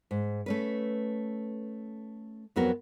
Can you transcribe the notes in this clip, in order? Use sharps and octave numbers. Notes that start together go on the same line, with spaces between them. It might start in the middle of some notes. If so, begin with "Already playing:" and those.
G#2
A3 C#4 B4
F2 F#3 B3 C4 F#4 A#4